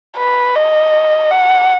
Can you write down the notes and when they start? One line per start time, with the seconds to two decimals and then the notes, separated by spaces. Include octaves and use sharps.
0.17 B4
0.55 D#5
1.31 F#5